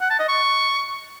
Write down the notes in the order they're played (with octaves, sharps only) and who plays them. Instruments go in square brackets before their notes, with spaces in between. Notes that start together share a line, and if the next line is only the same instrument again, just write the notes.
[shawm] F#5
A5
D#5
C#6